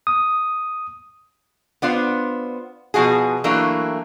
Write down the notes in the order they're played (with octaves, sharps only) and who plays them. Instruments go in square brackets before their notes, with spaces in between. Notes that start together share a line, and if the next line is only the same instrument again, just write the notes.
[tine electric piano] D#6
[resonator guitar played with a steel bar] B3 D4 F4 C5
B2 F3 F#4 G#4
E3 F#3 A3 A#3 D4 E4